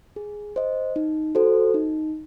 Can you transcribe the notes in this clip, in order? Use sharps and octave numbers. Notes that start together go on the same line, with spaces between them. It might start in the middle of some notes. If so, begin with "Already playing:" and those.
G#4
C5 D#5
D#4
F#4 A4 C5
D#4